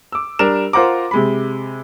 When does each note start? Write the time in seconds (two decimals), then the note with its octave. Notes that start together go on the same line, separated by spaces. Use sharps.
0.12 D6 E6
0.39 G3 D4 A#4 E7
0.73 F4 A#4 C5 F#5 A#5 D6
1.11 C3 G#3 B5